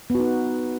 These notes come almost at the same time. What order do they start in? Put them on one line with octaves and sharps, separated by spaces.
B3 F#4 D#4